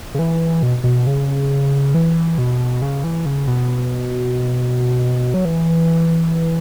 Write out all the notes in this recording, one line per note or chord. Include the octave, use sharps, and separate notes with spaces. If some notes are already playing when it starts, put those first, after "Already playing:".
C#3
E3
B2
B2
C#3
E3
B2
C#3
E3
C#3
B2
F#3
E3